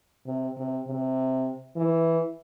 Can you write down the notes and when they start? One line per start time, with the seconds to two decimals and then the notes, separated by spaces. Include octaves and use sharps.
0.27 C3
0.58 C3
0.88 C3
1.77 E3